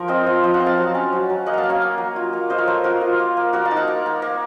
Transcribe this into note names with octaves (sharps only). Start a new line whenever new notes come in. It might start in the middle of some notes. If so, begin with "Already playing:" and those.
Already playing: F3 A#4
C4 C5 D#5
F4
F3 C5 D#5
F#5 A#5
C4
F5 A5
F#3
C#4
F#3
F#3
A#3 D#5 F#5
F5 A5 A#5
A#3
C#5 F5
A#3
F#3
F4
A#3
F4 C5 D#5
A#4 C#5
A#3 A4 C5
F4 F#4 A#4
F4
A#3
A#3
A#3 F#4 A#4
F5 A5
D#4
F#5 A#5
A#3
A#3
A#3